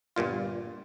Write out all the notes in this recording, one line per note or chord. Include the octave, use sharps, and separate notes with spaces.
G1 G2 A#2 F4